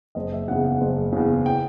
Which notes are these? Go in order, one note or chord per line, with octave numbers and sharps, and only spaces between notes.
F#1 D#5
E5
E2 C#3 F#5
F#5
F#1
E2 C#3
G5